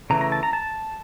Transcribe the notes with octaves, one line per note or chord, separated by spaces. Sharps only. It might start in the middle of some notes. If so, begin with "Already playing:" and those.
C#3 E3 A3 A#5
A#5
A5
A#5
A5